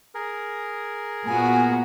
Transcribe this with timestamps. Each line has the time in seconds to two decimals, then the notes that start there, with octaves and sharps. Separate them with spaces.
0.15 G#4 A#4
1.27 A#2 B3 F#4 G#5